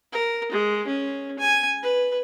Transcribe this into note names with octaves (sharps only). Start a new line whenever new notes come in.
A#4
G#3
C#4
G#5
B4